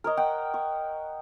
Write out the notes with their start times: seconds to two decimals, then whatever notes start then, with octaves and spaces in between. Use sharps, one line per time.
0.04 A#4 C#5 D#5
0.17 D#5 F#5 G5
0.54 C#6